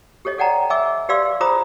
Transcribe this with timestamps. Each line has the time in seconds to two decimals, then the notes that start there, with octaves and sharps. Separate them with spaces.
0.25 G4 A4 C#5 D#5
0.38 A4 D5 F#5 G5 A5 A#5
0.70 D#5 E5 G#5 D6 E6
1.09 G4 B4 D5 F5 C6 E6
1.40 F4 G#4 C5 A#5 B5 D#6